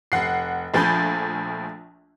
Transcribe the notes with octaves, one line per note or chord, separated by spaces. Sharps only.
F1 F#5 C7
A#1 F3 A3 G#5 B5 G6